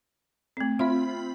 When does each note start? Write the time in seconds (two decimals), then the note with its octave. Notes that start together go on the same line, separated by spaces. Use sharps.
0.57 A3 C4
0.79 C4 F4 E5 B5